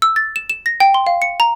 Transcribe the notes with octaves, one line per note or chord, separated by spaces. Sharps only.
E6
A6
E7
E7
A#6
G5
C6
F5
C#7
A#5